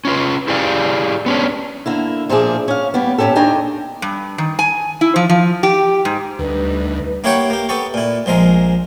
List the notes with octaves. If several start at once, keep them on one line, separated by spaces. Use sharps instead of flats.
C#4 F4 B4
E4 G4 G#4 D5 F5
B3 C#4 D4
D3 A#3 E4
A#2 F3 A#3 D4 G#4
C#4 F5
G3 A#3 B3
A#2 C#3 C#4 G4 A4
D#2 D#3 D4 G5 G#5 A#5
G2
D#3
G#5
E4
F3
F3
G4
G#2
D2 G3 A3 D#4 B4
A#3 E4 G4 C#5 F#5 G5
A#3 G4
B3 G4 A4 C#6
A#2 E4
A#1 F3 G#3 A#4